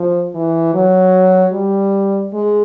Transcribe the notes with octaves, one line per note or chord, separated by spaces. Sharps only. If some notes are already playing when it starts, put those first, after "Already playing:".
Already playing: F3
E3
F#3
G3
G#3